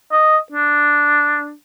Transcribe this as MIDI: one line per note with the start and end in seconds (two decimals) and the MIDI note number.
0.12 0.37 75
0.52 1.52 62